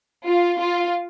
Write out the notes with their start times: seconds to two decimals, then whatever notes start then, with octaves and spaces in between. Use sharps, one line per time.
0.25 F4
0.58 F4